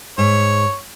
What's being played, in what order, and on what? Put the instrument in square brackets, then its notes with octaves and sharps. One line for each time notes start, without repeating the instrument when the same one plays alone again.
[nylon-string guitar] G#2 [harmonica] C#5